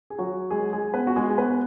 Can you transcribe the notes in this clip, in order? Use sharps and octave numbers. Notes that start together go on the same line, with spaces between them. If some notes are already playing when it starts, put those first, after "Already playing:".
G#4
F#3 F#4
G#3 G#4
G#3 G#4
B3 B4
F#4
G#3 G#4
G#4
B3 B4